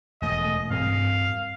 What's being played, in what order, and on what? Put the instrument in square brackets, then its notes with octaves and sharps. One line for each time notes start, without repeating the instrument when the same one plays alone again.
[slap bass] E1 A3 [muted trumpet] D#5
[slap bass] G2 C4 [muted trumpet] F5